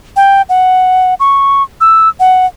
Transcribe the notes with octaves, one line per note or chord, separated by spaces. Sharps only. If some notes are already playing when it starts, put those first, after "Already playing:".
G5
F#5
C#6
E6
F#5